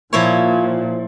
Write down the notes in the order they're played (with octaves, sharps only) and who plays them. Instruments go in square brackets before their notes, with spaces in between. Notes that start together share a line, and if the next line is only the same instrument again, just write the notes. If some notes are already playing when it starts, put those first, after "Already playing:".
[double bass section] A#2 [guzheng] F3 E4 C#5